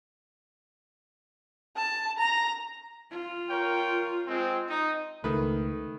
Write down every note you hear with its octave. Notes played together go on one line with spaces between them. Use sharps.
A5
A#5
F4
A#4 C#5 G5
G#3 C4
D#4
C#2 D#3 A3 B4